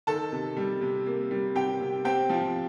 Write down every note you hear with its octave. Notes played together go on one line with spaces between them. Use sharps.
D#3 A4 A5
C3
G3
C3
A#3
G3
C3 G4 G5
C3
C4 G4 G5
F3